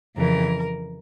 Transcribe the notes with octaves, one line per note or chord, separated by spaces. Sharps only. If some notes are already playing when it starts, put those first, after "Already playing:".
F2 C#3 E3 A#4